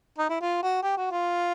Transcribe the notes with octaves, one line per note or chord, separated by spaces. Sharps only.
D#4
E4
F4
F#4
G4
F#4
F4